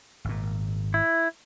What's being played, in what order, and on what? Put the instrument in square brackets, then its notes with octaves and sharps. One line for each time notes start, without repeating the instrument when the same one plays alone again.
[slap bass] G#1 A#2
[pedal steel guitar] E4